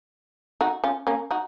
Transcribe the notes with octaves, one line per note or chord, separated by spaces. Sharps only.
D#4 F#4
C#4 F4
A#3 C#4
D#4 F#4